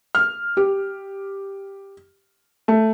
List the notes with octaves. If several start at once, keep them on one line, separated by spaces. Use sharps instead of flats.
F6
G4
A3